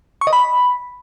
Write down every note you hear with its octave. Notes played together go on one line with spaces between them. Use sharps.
C#6
D#5
B5